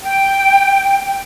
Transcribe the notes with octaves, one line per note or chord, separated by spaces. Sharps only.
G5